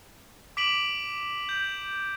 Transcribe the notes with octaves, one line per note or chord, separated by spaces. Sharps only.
D6 B6 D7 E7 F#7
G6